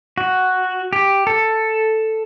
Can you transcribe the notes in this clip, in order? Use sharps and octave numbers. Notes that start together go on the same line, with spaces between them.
F#4
G4
A4